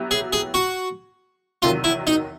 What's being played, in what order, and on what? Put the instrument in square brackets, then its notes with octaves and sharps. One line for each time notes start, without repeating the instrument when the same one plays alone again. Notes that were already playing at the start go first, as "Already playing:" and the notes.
Already playing: [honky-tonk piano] F#3 B3 E4 G4
[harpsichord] G#4
G#4
F#4
[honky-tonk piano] E2 C3 D#3 F#3 [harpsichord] F4
[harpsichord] E4
D#4